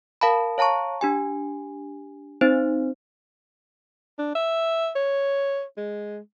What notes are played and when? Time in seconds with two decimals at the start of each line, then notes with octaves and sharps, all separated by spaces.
0.21 A#4 F5 A5 B5
0.58 C#5 F5 A5 A#5 C#6
1.01 D4 G4 G#5
2.41 C4 D#4 C5
4.19 D4
4.35 E5
4.95 C#5
5.77 G#3